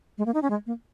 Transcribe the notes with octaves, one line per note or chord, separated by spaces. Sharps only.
G#3
A#3
D#4
C#4
G#3
A#3